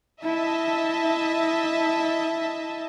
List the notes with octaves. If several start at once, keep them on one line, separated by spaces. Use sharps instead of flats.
E4 D#5 E5 A5